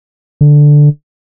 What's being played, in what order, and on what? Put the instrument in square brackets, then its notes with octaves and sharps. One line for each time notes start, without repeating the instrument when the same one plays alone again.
[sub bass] D3